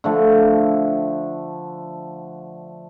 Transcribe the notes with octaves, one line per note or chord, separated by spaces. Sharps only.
D3 F3 A3